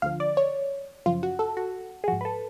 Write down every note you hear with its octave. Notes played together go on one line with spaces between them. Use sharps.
D2 D3 F3 F5
D5
C#5
F#2 C#3 F3 F4
F#4
A4
F#4
G#4
G#2 F3 F#4
B4
A4